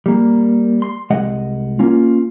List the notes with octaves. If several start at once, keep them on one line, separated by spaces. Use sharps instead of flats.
G3 A#3
C6
C2 G#3 D#5 F#5
A#3 C#4 F4